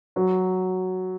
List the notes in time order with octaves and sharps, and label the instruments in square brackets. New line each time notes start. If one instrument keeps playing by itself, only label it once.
[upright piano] F#3